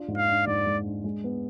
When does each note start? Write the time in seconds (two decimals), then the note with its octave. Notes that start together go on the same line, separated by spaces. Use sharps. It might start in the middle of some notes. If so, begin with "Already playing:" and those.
Already playing: D4 F4
0.08 G#2
0.18 F5
0.28 D4
0.47 G#2 D5
0.66 G#3
0.86 D4
1.04 G#3
1.24 B3